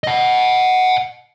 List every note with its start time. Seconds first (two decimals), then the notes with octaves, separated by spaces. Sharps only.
0.04 D#5 F#5